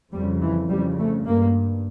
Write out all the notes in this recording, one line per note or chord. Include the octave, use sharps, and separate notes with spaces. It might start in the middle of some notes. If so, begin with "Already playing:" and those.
F2 C#3 G3
E3
F2 C#3 G3
A3
G2 A#3